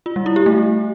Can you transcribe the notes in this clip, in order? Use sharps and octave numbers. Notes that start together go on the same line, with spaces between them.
F4
G3
E4
G4
A3